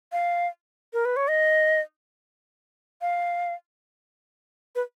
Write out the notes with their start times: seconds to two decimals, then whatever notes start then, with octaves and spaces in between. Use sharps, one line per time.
0.12 F5
0.93 A#4
1.05 B4
1.16 C#5
1.28 D#5
3.01 F5
4.75 B4